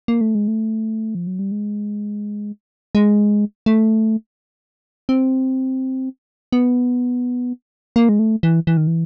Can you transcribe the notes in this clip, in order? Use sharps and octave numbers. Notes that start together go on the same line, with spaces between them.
A#3
A3
G#3
A3
F3
F#3
G3
G#3
G#3
A3
C4
B3
A#3
G#3
A3
E3
E3
D#3
E3